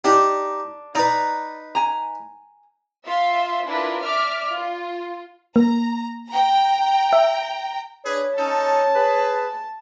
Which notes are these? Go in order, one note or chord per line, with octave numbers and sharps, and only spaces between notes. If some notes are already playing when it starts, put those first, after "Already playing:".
D4 D#4 G4
D#4 B4 D5 A#5
G#5 A#5
F4 E5 F5 C6
D4 E4 F4 A#4 B4
D5 E5 D6 F6
F4
A#3 A#5
G5 A#5
E5
D4 G#4 B4 C#5
C#4 D#4 A4 A5
G#4 B4